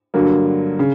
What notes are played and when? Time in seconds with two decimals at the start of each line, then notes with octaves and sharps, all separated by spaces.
0.14 G2 D3 F#3 A#3
0.79 C#3